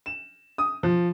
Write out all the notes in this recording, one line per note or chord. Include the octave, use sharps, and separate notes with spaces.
E7
D#6
F3